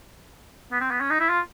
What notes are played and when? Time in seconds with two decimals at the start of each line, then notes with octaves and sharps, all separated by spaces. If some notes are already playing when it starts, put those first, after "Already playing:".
0.71 B3
0.81 C4
0.91 B3
1.00 C#4
1.10 D#4
1.20 E4
1.29 F4